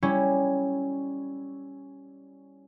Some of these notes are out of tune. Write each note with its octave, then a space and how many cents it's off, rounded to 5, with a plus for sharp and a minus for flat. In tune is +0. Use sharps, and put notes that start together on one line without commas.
G3 +0 C#4 +0 E4 +0